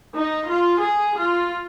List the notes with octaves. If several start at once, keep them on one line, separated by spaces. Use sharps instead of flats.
D#4
F4
G#4
F4